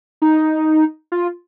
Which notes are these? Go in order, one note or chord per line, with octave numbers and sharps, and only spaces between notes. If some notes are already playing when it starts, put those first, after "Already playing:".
D#4
F4